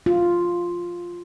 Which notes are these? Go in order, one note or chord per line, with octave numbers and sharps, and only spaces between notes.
F4